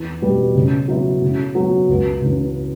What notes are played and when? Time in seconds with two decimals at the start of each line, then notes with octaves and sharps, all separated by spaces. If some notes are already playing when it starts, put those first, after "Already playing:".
Already playing: E2
0.22 B2 G3 B3
0.55 C#3
0.88 F#3 B3 E4
1.22 C#3
1.55 F#3 B3
1.89 C#2
2.22 C#3 E3